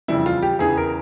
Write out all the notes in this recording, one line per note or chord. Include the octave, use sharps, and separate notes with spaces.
F2 C#3 E3 G3 E4
F4
G4
E2 C#3 E3 G#4
A#4